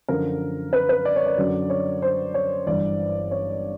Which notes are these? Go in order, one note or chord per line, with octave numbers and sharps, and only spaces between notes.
F#2 D3 F3 A#4
B4
B4
D5
C#5
D5
F#2 D3 F#3
C#5
C5
C#5
G1 G2 E3 D5
C#5